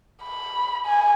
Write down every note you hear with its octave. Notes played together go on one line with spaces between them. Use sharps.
B5
G#5